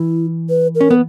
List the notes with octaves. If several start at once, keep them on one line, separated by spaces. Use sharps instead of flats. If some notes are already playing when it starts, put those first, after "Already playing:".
Already playing: E3 E4
B4
A#4
C#4
B3